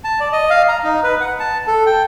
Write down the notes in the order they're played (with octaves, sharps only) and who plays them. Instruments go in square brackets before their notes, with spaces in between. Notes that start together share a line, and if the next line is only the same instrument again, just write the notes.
[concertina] A5
D5
D#5
F5
A#5
D#4
B4
F#5
A5
A4
G5